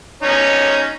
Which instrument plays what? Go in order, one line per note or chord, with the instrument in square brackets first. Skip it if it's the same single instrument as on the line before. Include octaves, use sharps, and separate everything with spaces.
[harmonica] C#4 D#4 C#5